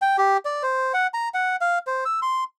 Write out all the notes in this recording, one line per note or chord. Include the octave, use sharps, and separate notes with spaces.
G5
G4
D5
C5
F#5
A#5
F#5
F5
C5
E6
C6